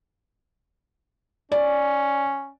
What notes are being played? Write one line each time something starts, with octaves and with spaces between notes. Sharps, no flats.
C#4 D5